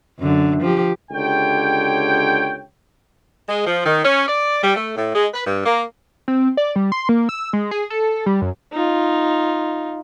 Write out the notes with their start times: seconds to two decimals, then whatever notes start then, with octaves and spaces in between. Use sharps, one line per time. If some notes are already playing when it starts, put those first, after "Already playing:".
0.19 F#2 D3
0.62 F3 G4
1.12 C#2 D3 G4 C#5 G5
3.49 G#3
3.66 F3
3.86 D#3
4.04 C#4
4.28 D5
4.63 G3
4.76 A3
4.96 A2
5.14 G#3
5.33 B4
5.46 G2
5.65 A#3
6.28 C4
6.57 D5
6.76 G3
6.92 C6
7.09 A#3
7.29 E6
7.53 G#3
7.71 G#4
7.90 A4
8.26 G3
8.42 F#2
8.72 D#4 F4